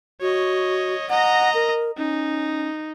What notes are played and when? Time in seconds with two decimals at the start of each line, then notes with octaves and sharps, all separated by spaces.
0.21 F#4 C#5 D#5
1.09 D#5 F#5 A#5
1.54 A#4
1.97 C#4 D#4